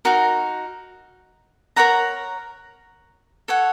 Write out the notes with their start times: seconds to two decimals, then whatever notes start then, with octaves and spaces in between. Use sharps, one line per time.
0.05 D#4 F#4 A#4
1.76 A#4 C#5 F#5 A#5
3.48 A4 C#5 F#5